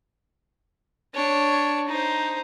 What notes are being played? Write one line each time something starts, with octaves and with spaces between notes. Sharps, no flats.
D4 C#5
D#4 C5